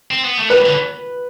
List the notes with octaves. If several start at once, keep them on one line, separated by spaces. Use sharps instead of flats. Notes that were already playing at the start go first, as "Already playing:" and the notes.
C4
B3
A3
G3 B4
D3